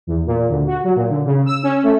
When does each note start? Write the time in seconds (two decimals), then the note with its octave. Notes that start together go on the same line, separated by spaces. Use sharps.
0.07 E2
0.27 A#2
0.49 D2
0.67 F#4
0.84 F#3
0.96 A#2
1.10 D3
1.26 C#3
1.46 E6
1.63 C#4
1.83 A3